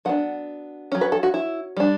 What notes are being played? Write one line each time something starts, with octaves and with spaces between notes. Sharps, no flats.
F#3 B3 D4 F#5
F#3 C#4
B4
A4
F#4
E4
G3 D4